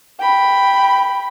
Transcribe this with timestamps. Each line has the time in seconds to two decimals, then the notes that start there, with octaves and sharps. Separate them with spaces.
0.20 G5 B5